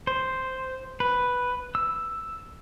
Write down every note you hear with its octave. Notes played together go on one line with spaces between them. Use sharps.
C5
B4
E6